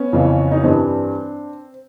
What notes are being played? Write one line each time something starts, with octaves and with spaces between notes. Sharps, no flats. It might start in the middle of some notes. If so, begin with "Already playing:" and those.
Already playing: B3 C#4
F2 C#3 E3
D#4
G2 E3 C4 D4